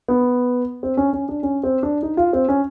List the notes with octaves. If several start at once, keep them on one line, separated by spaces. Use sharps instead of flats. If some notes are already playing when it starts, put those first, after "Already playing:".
B3
C4
C#4
C#4
D4
C#4
C4
D4
D#4
F4
C4
C#4